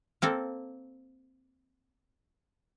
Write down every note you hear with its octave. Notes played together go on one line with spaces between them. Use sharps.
A#3 C4 A4